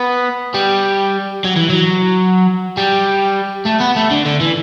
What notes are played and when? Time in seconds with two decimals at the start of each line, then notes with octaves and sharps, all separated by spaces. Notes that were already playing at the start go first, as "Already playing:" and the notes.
Already playing: B3
0.54 G3
1.44 F#3
1.56 E3
1.69 F#3
2.77 G3
3.66 A3
3.81 B3
3.96 A3
4.11 D3
4.25 D3
4.41 E3